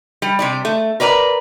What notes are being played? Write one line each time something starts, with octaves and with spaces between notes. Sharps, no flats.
G3
C3 G3 D5
A3
A#4 B4 D5 E5 A#5